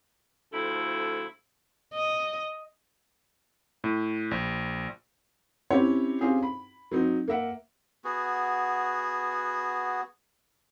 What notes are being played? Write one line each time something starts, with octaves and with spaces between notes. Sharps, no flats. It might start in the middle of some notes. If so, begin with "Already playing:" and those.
D2 F3 E4 A4
D#5
A2
A#1
C4 C#4 E4 G4 C#5
C4 C#4 F4 G4 G#4
B5
F#3 C4 D#4
A#3 A#4 E5 F#5
B3 F#4 G#4